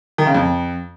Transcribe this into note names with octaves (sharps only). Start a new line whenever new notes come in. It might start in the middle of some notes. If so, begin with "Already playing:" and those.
D#3
C#3
F2